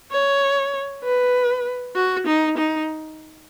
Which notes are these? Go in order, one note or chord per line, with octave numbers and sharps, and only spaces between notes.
C#5
B4
F#4
D#4
D#4